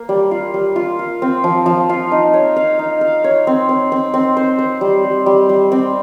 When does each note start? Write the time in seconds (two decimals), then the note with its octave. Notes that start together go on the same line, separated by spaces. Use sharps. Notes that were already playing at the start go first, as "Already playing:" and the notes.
Already playing: A#3
0.09 G3
0.31 F4
0.54 G3
0.76 F4
0.99 F4
1.22 C4
1.44 F3
1.66 F3
1.89 F4
2.11 D#4
2.34 C#5
2.56 F5
2.79 D#4
3.01 F5
3.24 C#5
3.47 C4
3.69 C4
3.92 C4
4.14 C4
4.37 C5
4.59 C5
4.81 G3
5.04 G3
5.26 G3
5.49 G3
5.72 C4